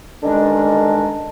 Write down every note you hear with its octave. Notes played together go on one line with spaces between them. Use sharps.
G2 D3 D#3 G#3 C#4 D4